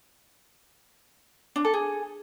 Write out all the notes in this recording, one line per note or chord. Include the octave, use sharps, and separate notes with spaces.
D4
A4
G#4